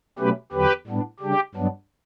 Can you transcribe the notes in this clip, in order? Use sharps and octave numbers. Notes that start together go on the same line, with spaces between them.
B2 F#3 A3 C#4 G4 B4
E2 D3 F#3 G4 B4
A2 G3 B3 D4
C#3 G3 D4 G4
G2 F#3 B3 D4